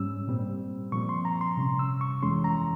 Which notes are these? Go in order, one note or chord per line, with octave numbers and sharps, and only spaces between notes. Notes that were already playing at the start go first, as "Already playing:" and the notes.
Already playing: G#2 G3 C#4 E6
A#2 G3 C4
A#2 F3 C4 C#6
C6
A#5
C6
C3 G3 C#4
E6
C#6
F2 E3 G#3 C#4 C6
A#5